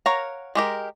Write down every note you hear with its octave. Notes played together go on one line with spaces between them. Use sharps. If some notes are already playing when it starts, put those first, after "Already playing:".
A#4 C#5 F5 F#5 A#5
G#3 G4 A#4